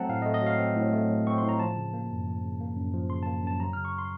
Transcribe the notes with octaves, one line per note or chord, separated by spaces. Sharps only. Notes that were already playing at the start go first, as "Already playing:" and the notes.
Already playing: F#3 A3 C4 F#5 A5 A#5
A2 F5
D#5
A3
D#5
F#3 F5
C4
A2
A3
F#3
C4 C#6
A2 C6
A#5
F3 A5
C#3
A#3
F#2
F3
C#3
A#3
F#2
F3
C#3 C6
A5
A#3
F#2 A5
F#3 A#5
F6
C#3
C#6
C6